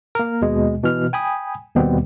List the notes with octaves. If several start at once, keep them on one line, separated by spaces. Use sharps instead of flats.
A#3 A#4
D#2 B2 G#3
B2 E3 F6
G5 G#5 B5 D#6
D#2 B2 D#3 G3 B3 C4